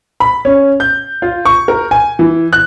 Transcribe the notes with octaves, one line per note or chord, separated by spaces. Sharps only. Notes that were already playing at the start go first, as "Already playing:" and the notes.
B5
C#4
G6
F4
C#6
A#4
G#5
E3
F#6